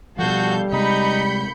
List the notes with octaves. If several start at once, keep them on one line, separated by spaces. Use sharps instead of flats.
B2 F3 G3 F#4 A4 F5 G6
C3 G#3 D#4 B5 G6 C#7